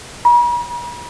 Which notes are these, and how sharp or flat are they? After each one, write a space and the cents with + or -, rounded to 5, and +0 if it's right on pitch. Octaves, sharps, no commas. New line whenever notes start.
B5 -45